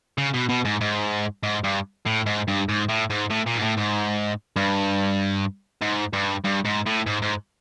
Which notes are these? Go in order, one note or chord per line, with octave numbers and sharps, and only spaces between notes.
C#3
B2
B2
G#2
G#2
G#2
G2
A2
G#2
G2
G#2
A2
G#2
A2
A#2
G#2
A2
G#2
G2
G#2
G2
G2
G#2
A2
G#2
G#2